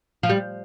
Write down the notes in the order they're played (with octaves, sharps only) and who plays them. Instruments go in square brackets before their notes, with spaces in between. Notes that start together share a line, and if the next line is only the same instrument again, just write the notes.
[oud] F3
G3